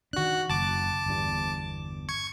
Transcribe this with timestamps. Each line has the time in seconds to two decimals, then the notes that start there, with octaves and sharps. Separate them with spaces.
0.13 D#3 D4 F#4 F#6
0.50 F#1 A5 D6
1.06 G1 E2 G2
2.09 C#6 G#6